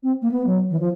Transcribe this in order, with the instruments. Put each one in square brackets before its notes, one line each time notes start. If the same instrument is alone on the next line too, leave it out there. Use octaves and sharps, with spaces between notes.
[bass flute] C4
A#3
B3
F#3
E3
F3